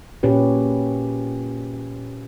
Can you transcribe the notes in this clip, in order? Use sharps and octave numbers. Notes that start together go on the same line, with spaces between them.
A#2 C#4 G4 B4